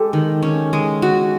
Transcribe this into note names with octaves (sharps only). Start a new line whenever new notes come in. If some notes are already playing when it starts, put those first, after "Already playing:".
Already playing: G#3 G4 A4
D#3
C#4
G#3
F#4